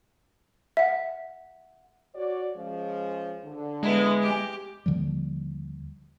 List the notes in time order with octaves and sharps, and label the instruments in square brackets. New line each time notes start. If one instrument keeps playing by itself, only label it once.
[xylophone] E5 F#5
[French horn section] F#4 C#5 D5
F3 G#3 C#4
D3
[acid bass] G#3 [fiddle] B3 E4
[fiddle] G4
[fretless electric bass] D#2 D3 F3 G3